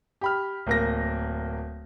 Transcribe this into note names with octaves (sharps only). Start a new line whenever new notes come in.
G4 B5 F6
D1 A#3 A#6